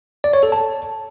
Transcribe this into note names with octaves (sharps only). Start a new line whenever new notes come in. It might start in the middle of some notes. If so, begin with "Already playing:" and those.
D5
C#5
A4
A5